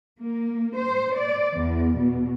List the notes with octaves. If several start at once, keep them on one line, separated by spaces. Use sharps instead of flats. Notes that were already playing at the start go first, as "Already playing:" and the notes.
A#3
C5
D5
E2
B2